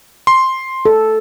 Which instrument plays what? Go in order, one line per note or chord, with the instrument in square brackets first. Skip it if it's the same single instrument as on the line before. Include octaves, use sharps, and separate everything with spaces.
[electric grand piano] C6
[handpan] A4